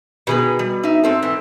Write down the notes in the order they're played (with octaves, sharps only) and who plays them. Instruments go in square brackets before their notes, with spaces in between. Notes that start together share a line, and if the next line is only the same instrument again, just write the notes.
[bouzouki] B2 [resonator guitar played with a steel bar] D#3 G#4 B4
[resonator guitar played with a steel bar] G3
D#4 E5
G#2 C4 A4
[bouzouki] E3